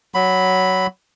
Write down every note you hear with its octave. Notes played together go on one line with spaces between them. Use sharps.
F#3 B5